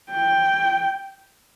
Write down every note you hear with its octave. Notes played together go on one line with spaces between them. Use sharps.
G5